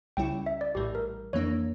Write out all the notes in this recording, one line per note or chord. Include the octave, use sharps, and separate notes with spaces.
C#2 C#3 G3 C#4 E4 G5
E5
D5
A#1 A2 E3 G3 G4
A#4
F2 E3 A#3 D4 C#5